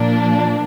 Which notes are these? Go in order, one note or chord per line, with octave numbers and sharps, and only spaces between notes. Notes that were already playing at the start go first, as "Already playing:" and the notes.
Already playing: A#2 F3 A#3 D4